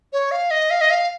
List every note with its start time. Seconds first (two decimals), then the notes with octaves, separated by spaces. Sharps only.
0.13 C#5
0.31 F5
0.51 D#5
0.71 F5
0.81 D#5
0.91 F5